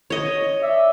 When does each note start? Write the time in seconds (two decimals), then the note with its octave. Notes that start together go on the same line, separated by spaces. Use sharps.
0.10 C#5 D#5
0.61 D5 E5